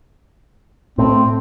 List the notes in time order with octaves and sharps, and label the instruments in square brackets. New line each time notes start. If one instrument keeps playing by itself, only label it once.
[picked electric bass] A2 [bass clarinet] C4